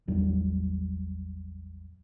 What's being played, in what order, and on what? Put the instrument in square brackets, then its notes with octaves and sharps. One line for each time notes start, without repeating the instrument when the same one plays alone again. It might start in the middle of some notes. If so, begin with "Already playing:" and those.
[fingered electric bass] A1 E2 F#3 G3